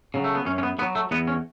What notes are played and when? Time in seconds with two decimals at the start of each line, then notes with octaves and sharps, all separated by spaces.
0.14 C#3 F#3
0.24 A3
0.35 B3
0.46 F#2 C#4
0.58 C#4
0.63 B3
0.79 D3 B3
0.82 F#3
0.95 A3
1.11 E2 B3
1.27 C#4